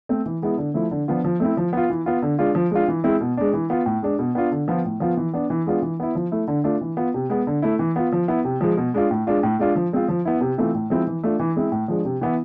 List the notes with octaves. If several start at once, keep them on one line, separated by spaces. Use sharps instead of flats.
A3 C4
E3
G#3 B3 E4
D3
F3 A3 E4
D3
F3 B3 D4 F4
F3
A3 C4 E4
F3
B3 F4
E3
B3 F4
D3
G#3 D4 F4
F3
G#3 D4 F4
E3
G#3 C4 E4
B2
G#3 D4
E3
B3 F4
A2
G#3 D4
B2
B3 D4 F4
D3
F3 B3 F4
A2
F3 B3 F4
E3
B3 D4
E3
G#3 B3 D4 F4
E3
B3 E4
F3
A3 E4
D3
A3 D4 F4
E3
B3 F4
C3
G#3 B3
D3
A3 E4
E3
B3 F4
F3
B3 E4
C3
F3 G#3
B2
G#3 D4 F4
A2
G#3 D4 F4
A2
G#3 D4 F4
F3
G#3 C4 F4
F3
B3 E4
C3
E3 A3 C4 F4
A2
F3 G#3 C4 E4
E3
A3 D4 F4
E3
G#3 C4 E4
A2
F3 G#3 D4
C3
E3 B3 E4